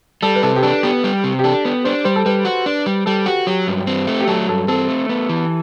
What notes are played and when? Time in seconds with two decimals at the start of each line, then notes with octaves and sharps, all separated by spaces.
0.22 G3 A4
0.35 B4
0.43 C3 A4
0.56 G4
0.62 D4 A4
0.83 B3 G4
1.04 G3
1.24 C3
1.39 G4
1.44 D4 A4
1.65 B3
1.84 D4 C5
2.04 G3 C5
2.16 A4
2.25 G3 B4
2.45 F#4
2.66 D4
2.86 G3
3.06 G3 A4
3.26 F#4 G4
3.47 F#3 G4
3.68 G2
3.87 C4
4.07 A3
4.20 G4
4.27 F#3 A4
4.48 G2 A4
4.68 C4 A4
4.88 A3
5.09 B3
5.29 E3